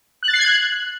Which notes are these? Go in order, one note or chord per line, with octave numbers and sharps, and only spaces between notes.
F#6
A6
C7
G#6
F#6